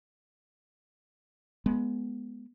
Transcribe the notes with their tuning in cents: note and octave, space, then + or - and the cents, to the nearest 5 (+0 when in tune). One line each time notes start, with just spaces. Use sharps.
G#3 +15 B3 -5